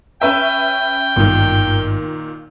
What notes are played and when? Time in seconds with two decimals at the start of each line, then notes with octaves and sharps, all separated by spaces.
0.22 C#4 B4 E5 G5
1.16 G#1 G2 A#2 D#3 B3